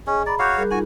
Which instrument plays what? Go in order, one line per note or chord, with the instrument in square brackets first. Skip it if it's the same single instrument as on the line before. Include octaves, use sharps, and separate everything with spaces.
[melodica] C#4 [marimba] G#4 D#5
[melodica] D5 [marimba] A#5 B5
[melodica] F#4 C#5 F5 [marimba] D6 F#6 G6
[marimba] G3 G#4 A#4
[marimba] D#4 F4 [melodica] F#4 G#5